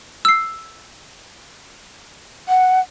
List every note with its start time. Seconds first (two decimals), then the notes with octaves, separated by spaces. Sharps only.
0.25 E6 C7
2.48 F#5